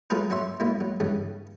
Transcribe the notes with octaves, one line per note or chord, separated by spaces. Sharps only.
F#3 A3 F4 G#4 A#4 B4
F#3 C#4 E5 C6
B1 A#3 E4
F#3
G2 C#3 E3